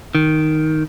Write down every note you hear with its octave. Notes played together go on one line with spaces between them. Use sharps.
D#3